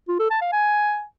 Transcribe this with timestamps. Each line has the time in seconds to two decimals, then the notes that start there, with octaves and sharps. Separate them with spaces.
0.09 F4
0.20 A4
0.31 A5
0.42 F5
0.53 G#5